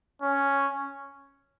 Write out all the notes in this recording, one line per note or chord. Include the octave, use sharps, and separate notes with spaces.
C#4